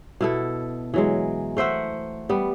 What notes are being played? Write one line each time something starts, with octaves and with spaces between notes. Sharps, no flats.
B2 E4 A4
E3 F#3 G#3
A3 C5 E5 F#5
G3 B3